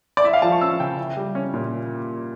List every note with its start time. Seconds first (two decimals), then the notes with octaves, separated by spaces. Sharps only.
0.17 D5
0.24 E4 E5
0.33 F5
0.42 F3 A5
0.52 C#6
0.61 C#4 E6
0.80 C#3 G5
0.98 E4
1.17 G3
1.35 C#4
1.54 A#2